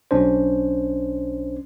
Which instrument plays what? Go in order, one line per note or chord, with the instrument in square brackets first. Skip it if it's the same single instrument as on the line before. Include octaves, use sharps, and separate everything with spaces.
[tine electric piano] B1 C#4 D4 C5